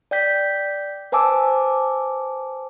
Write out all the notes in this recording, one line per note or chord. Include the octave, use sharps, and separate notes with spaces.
D5 G5 G6 B6
B4 C5 G#5 A5 D6 E6